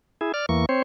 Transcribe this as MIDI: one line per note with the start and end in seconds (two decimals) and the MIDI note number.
0.21 0.32 64
0.21 0.32 68
0.34 0.46 74
0.34 0.46 89
0.49 0.66 40
0.49 0.66 52
0.49 0.66 58
0.49 0.66 85
0.69 0.82 60
0.69 0.82 72
0.69 0.82 73